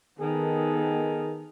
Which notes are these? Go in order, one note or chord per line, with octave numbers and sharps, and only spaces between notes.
D#3 B3 G#4 A4